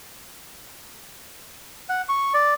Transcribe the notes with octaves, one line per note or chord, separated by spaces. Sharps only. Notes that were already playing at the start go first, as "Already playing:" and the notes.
F#5
C#6
D5